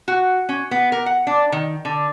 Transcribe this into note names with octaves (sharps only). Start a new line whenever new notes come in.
F#4
C#4
B3
A#4
F#5
D4
D#3
D3